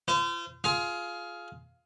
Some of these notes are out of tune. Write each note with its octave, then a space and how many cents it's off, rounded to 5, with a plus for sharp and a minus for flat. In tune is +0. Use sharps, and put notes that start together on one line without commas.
F4 -40 C5 -35
F4 +0 G#4 +25